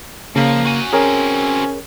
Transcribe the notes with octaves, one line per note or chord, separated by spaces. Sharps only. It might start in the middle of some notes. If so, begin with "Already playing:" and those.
C#3 F3 A#3
F#4 G#5
C4 C#4 F#4 G#4 A#4 C#5